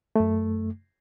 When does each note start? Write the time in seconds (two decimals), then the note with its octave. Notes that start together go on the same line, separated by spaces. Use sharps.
0.16 F#2 A3